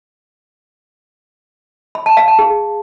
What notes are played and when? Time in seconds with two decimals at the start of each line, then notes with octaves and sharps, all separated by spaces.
1.95 B5
2.06 A5
2.17 F5
2.28 A5
2.39 G#4